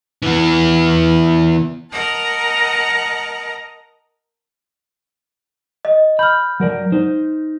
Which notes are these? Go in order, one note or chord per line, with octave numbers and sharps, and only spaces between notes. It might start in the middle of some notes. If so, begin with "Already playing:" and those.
E3 B3
A#4 D#5 F#5 A5 A#5
D#5
B5 F6 G6
F#3 A#4 D5
D#4 C5